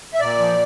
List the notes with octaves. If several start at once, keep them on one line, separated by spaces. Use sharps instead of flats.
E5
A#2 D5
F3